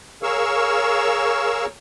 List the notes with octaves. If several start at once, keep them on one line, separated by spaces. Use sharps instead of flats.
G#4 A#4 C#5 F5 C#6 E6